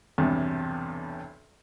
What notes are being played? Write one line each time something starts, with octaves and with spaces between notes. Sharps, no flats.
B1 E2 G2 C3